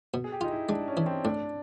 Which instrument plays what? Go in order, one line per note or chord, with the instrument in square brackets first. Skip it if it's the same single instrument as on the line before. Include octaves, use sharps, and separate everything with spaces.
[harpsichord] B2
[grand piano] G#4
G4
[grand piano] D#4 [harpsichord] F4
[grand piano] E4
[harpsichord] G#3 [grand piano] D4
[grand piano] C#4
[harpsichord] E3
[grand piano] C4
[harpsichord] A2 [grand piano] D4